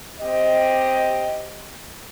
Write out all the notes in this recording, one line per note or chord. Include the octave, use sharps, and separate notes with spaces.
C4 G4 D#5